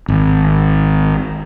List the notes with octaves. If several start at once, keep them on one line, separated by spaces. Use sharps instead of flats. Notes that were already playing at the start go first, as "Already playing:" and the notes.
G#1